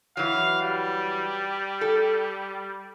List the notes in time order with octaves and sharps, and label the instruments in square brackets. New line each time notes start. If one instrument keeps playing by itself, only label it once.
[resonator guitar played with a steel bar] E3 F#3 [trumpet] F5
[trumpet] G3
[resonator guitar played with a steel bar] A4